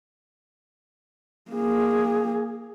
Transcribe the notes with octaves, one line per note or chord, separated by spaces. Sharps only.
A#3 G#4